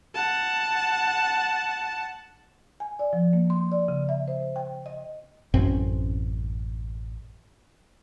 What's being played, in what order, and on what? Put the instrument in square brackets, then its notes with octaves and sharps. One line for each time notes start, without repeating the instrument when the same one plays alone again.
[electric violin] F#5 A5
[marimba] G#5
D5
F3
A#3
C6
D5
C#3
E5
C5
G5
D#5
[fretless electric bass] A1 F#2 C4 C#4